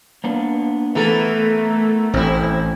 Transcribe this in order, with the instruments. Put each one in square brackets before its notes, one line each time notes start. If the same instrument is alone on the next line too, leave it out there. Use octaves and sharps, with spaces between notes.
[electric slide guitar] A#3 B3 D4
[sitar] E3 A4 [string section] A3 [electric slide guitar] B3 A#4
[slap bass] A1 [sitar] C4 E4